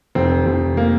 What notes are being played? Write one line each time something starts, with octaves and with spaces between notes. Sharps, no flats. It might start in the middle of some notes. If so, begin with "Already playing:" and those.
F1 C4
F1
A#3